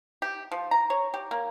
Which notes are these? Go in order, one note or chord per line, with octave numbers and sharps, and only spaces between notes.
G4
F3
A#5
C#5
G4
A#3